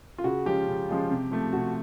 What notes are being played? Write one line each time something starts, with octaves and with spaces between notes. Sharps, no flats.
F4
C#3 F#4
F3 G#3 C#4 F4 G4
C#3
F3 G#3 C#4 F4
C3
F3 A3
C3 F#4